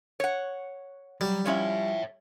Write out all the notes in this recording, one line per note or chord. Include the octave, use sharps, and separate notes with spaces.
C#5 F#5
F#3 G3
F3 C#4 E4 C#5 E5